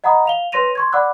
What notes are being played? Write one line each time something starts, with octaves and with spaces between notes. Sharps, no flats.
D#5 F#5 A#5 B5 D#6
F5 F7 G7
B4 C#5 C6 A#6 D#7 F7
C6 C#6 G#6
D5 F#5 B5 D6 E6 F#6